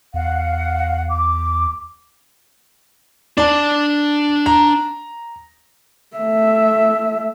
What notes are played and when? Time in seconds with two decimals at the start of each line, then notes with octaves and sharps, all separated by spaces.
0.14 E2 F5 F#5
1.09 D6
3.38 D4 D5 A5
4.46 A#5
6.17 A3 E5